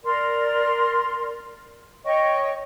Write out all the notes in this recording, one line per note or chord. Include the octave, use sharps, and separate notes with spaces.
A#4 D5 C6
C#5 D#5 G5 C#6